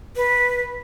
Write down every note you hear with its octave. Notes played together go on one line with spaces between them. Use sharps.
B4